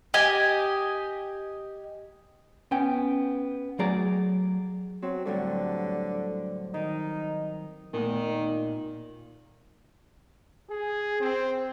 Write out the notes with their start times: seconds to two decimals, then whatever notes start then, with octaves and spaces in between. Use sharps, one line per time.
0.14 G4 D#5 G#5
2.71 B3 C#4 G5
3.79 F#3 A3 G#4 D5 A#5
5.02 F#3 C4
5.25 A2 D3 F#3 G3
6.74 D#3 D#4
7.94 A#2 D#3 A3 B3 D#4
10.70 G#4
11.21 C4